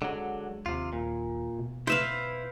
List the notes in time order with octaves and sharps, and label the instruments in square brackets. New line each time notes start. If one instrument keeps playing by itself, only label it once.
[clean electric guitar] D3 F#3 [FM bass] G#3
[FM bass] D#2 [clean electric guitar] C3 F4
[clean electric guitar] A#2
[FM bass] B2
[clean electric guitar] E4 C5 [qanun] B4 E5 F5